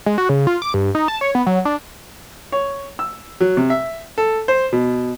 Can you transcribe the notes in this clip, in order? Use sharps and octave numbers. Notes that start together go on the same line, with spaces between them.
G#3
F#4
C#3
F4
D6
G2
D#4
A5
C#5
B3
F#3
D4
C#5
E6
F#3
C3
E5
A4
C5
B2